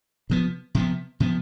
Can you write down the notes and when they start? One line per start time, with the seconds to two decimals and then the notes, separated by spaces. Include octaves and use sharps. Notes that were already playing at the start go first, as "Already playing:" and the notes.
0.30 C3 F3 B3
0.75 C3 F3 B3
1.20 C3 F3 B3